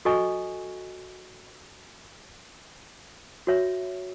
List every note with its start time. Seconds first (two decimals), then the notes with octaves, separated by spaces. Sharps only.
0.05 F#4 A4 D#5 G#5 C#6
3.47 F#4 C#5 E5